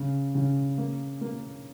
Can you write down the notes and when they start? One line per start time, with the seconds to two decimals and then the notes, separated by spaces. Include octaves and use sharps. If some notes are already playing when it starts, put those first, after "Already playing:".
Already playing: C#3
0.35 C#3
0.78 A#3
1.21 A#3